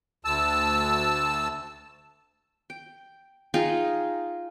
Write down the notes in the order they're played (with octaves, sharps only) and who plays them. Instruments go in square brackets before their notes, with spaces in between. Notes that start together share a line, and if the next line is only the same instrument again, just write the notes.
[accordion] D2 A5 E6
[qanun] G5
D#4 F4 G#4 G5